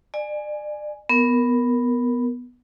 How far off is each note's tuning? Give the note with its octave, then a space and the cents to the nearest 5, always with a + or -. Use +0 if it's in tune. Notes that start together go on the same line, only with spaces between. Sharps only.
D5 +30 G#5 +0
B3 +0 A#4 +0